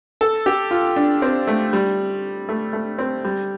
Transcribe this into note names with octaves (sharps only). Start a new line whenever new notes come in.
A4
G4
F4
D4
C4
A3
G3
A3
A3
C4
G3